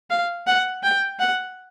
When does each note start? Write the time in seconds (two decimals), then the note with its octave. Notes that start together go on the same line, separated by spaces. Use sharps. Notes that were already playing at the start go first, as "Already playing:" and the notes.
0.10 F5
0.47 F#5
0.83 G5
1.20 F#5